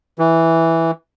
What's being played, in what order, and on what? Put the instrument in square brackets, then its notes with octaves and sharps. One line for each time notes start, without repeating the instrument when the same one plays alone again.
[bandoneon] E3